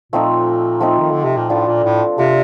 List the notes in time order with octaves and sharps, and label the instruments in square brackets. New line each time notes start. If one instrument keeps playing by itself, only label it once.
[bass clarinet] A#2 [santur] F3 A3 C4 D#4
[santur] F3 A3 C4 D#4
[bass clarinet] D#3
D3
C3
A#2
[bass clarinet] A2 [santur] D4 F4 A4
[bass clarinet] A#2
A2
[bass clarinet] C3 [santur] D4 F4 A4